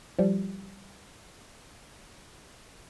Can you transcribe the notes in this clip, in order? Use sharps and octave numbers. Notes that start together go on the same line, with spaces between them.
F3 G3